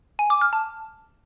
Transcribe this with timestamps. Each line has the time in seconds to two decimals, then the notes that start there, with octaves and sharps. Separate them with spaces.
0.19 G#5
0.30 D6
0.41 F6
0.53 A5